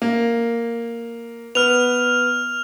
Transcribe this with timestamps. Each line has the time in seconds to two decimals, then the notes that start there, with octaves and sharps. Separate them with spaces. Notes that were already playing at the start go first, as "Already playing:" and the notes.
0.02 A#3
1.55 B3 F6 F7